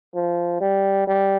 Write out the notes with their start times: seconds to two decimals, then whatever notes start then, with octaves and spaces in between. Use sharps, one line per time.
0.15 F3
0.60 G3
1.07 G3